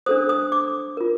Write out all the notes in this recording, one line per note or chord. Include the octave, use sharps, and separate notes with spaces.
D4 A4 C5 D#6
D#6
D6
F4 A#4